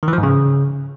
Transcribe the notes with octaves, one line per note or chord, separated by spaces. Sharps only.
D#3
E3
F3
G#2
C#3